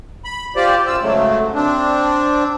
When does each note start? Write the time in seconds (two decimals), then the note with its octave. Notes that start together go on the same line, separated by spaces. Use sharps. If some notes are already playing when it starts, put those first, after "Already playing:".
0.25 B5
0.56 F4 G4 C5 D5
0.87 F#2 F4 E6
1.02 G#2 C#3 F#3 A3
1.55 C4 D4